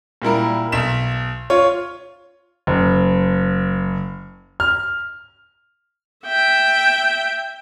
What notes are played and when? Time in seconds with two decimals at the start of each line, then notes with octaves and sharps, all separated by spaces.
0.22 A#2 G3 E4 A#4
0.72 B1 B6 E7
1.50 F4 C#5
2.67 F#1
4.60 F6
6.26 E5 G5